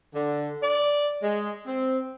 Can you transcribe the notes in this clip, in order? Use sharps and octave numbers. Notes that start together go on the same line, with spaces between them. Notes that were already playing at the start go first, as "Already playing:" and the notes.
D3
D5
G#3
C4